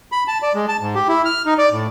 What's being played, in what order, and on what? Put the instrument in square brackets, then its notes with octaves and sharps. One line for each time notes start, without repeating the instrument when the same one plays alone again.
[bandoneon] B5
A5
D5
G#3
A5
G#2
G4
E4
F6
D#4
D5
A2